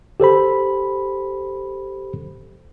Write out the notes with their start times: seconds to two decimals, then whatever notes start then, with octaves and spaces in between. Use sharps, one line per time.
0.20 G4 A4 C5 B5